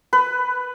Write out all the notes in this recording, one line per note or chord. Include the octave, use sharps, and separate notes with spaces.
B4